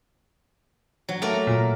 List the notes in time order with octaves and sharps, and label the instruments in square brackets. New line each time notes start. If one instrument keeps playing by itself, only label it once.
[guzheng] F#3
A3 A#3 A#4
[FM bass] A#2